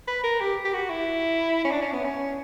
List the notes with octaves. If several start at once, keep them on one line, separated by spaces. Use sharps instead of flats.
B4
A#4
G4
G4
F#4
E4
C#4
D4
C#4
B3
C#4